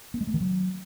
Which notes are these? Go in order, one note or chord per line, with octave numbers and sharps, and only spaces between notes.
B3
G#3
A3
D#3
F#3